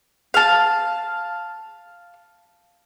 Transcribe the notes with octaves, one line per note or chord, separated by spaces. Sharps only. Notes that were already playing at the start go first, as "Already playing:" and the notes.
F5 A5